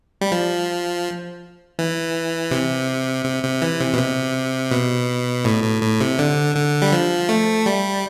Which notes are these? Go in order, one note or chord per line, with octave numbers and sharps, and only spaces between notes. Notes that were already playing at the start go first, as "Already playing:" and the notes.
G3
F3
E3
C3
C3
C3
E3
C3
B2
C3
B2
A2
A2
A2
C3
D3
D3
G3
F3
A3
G3